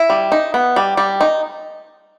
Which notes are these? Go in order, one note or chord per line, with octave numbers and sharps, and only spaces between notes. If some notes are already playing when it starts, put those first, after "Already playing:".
Already playing: E4
G3
D#4
B3
G3
G3
D#4